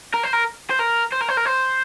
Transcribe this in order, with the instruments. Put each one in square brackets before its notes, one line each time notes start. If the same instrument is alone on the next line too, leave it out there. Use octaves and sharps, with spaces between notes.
[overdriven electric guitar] A#4
C5
A#4
C5
A#4
C5
A#4
C5
A#4
C5